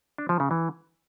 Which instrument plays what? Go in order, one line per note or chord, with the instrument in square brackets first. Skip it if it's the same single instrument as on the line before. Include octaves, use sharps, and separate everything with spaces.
[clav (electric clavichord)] D4
F3
C#3
E3